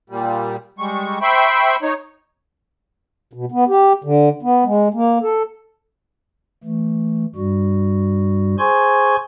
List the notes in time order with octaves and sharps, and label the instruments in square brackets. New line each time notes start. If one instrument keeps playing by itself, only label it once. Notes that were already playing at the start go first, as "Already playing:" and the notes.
[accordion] A#2 G3
G3 G#3 C#6
C5 E5 G5 B5 C#6
D#4 C#5
[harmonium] B2
B3
G4
D3
B3
G#3
A#3
A4
[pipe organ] E3 A3
G2 G3 F#4
G#4 C5 G#5 C6 C#6 G#6